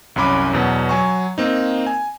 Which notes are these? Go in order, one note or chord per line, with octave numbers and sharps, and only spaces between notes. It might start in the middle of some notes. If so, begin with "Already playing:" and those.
C2 F#2 C#4 B5 D6
E2 B2 F#3
F#3 G#5 C#6
A#3 C4 D#4
G#5